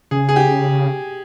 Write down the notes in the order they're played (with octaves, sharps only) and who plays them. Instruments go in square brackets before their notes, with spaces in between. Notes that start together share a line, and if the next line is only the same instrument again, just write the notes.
[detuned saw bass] C#3 [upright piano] G#4
[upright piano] G#4
G4